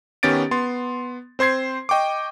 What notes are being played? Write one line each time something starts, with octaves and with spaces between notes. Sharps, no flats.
D#3 B3 C#4 G4 A6 D7
B3 C6 A6
C4 C5 C6 G#6 C7
D#5 G5 C#6 D6